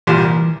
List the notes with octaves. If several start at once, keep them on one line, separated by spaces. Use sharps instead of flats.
C2 A#2 E3 G3